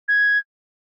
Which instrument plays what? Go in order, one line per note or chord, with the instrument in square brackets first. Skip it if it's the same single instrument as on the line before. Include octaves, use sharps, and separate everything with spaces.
[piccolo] G#6